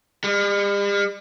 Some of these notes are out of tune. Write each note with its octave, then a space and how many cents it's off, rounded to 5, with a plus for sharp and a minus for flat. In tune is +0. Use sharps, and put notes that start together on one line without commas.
G3 +45